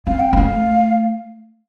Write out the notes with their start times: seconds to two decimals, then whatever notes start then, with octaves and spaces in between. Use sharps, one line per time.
0.07 C4 F5
0.20 G5
0.33 A3 C4 F5